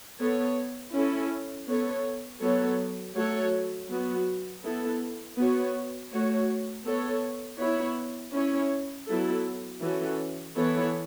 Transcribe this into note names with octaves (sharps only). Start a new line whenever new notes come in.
B3 A4 C#5
C#4 E4 A4
B3 A4 C#5
F#3 B3 A4 C#5
F#3 A3 F#4 A4 C#5
F#3 B3 F#4
B3 E4 A4
B3 F#4 C#5
A3 F#4 C#5
B3 A4 C#5
B3 E4 C#5
C#4 E4 C#5
F#3 B3 E4 A4
E3 C#4 F#4 A4
E3 B3 E4 A4 C#5